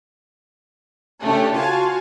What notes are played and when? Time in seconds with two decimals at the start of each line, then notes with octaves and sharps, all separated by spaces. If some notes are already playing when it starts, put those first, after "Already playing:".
1.22 C#3 A3 C#4 D4 G4 A4
1.54 F4 F#4 F5 G#5 A5